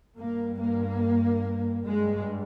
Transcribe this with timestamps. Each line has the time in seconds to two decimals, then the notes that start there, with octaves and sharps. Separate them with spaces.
0.17 G2 A#3
0.59 A#3
1.86 G2 G#3